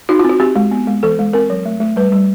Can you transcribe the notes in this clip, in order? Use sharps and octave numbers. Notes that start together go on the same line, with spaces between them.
D#4 F#4
F4
C4 F#4
C4 G4
G#3
B3
G#3
E3 A4
G#3
C4 A#4
F#3
A3
A3
G3 B4
G3